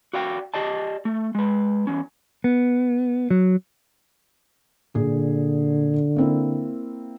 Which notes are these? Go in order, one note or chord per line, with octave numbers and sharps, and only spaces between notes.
F#4 D5 F5 G5
G4 D5 D#5 A5
A3
G#3 B4
E2 C#4
B3
F#3
A#2 D3 G#4
A#3 C4 E4